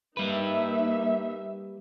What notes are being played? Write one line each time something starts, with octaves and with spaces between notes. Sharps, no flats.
G3 A#3 D#4 B4 E5